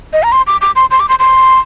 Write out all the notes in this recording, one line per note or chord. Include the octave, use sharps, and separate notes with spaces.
D#5
A#5
C6
D6
D6
C6
C6
D6
C6
C6